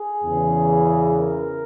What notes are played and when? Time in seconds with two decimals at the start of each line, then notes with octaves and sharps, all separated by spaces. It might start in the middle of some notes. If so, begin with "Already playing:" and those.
Already playing: G#4
0.22 E2 C#3 E3
1.19 A#4